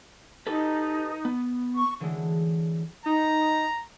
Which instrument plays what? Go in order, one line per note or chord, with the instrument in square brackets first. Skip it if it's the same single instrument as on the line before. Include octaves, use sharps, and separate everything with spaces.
[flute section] D#4 [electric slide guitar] G4 A4 B4
[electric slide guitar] B3
[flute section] C#6
[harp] D3 E3 F#3 G#3 A3 E4
[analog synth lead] D#4 [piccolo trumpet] A#5